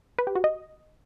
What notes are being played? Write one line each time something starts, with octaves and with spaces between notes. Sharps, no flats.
B4
G4
F#4
D#5